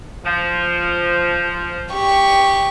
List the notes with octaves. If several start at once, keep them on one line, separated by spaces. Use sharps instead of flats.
F3
G4 C#6